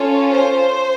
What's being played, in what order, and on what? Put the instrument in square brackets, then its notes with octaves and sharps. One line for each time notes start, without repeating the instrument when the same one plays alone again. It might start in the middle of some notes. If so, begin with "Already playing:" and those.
Already playing: [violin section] C#4 F4 A4 C#5
C5